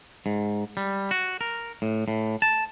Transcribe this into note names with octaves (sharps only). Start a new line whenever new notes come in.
G#2
G3
F#4
A#4
A2
A2
A5